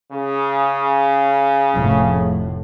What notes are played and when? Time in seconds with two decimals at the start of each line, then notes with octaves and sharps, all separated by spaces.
0.12 C#3
1.72 F1 A2